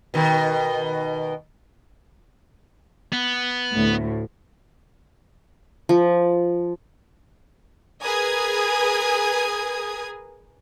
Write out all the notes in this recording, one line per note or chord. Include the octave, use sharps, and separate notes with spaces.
B2 D#3
B3
D2 A2
F3
G#4 A#4 B4 G#5 D#6 G#6